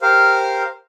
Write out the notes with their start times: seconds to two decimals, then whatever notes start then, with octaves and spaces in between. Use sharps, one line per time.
0.02 G4 A#4 C5 F5